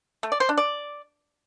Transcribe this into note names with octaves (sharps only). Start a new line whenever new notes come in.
A3
D5
C5
D4
D5